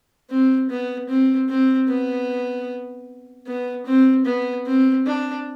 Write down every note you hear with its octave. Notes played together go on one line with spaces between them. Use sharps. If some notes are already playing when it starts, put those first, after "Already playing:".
C4
B3
C4
C4
B3
B3
C4
B3
C4
D4